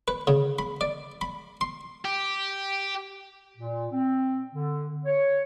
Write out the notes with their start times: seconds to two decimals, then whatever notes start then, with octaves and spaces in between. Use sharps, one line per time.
0.08 B4
0.27 C#3
0.59 B5
0.81 D5
1.21 B5
1.61 C6
2.05 G4
3.57 A#2
3.92 C4
4.53 D3
5.05 C#5